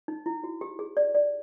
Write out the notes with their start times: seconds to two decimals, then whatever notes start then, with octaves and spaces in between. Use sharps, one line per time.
0.08 D#4
0.26 E4
0.44 F#4
0.61 G4
0.79 G#4
0.97 D5
1.15 D5